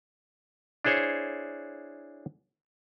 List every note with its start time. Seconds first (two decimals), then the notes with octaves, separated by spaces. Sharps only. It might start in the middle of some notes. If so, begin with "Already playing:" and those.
0.84 D4 E4 G#4 C5 C#5